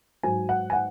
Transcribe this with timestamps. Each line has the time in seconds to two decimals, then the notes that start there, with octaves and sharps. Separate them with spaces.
0.23 G#2 F#3 G#5
0.49 F#5
0.70 G#5
0.73 F#5